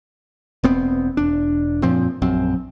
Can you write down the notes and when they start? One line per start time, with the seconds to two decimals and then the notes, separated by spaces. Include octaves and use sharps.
0.64 E1 B3 C4
1.17 E1 D4
1.83 F#2 A#2 F3 C4
2.22 A#1 F#2 C4